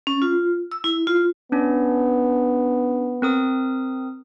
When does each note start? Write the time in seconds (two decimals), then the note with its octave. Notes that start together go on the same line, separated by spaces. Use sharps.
0.07 C#4
0.22 F4
0.71 E6
0.84 E4
1.07 F4
1.52 B3 C#4 D4
3.22 C4 A#4 D#6